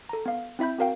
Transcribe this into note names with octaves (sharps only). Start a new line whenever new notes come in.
A4 A#5
B3 F5
C4 E4 E5 B5 G6
C4 F#4 A#4 F5 G5